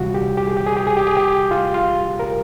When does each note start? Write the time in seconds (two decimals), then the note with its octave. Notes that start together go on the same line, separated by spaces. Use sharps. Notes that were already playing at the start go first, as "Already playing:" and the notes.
Already playing: D2 C3 E3 G3 F4 F#4
0.14 G4
0.37 G4
0.47 G#4
0.57 G4
0.67 G#4
0.77 G4
0.87 G#4
0.97 G4
1.07 G#4
1.17 G4
1.51 F4
1.74 F4
2.20 A#4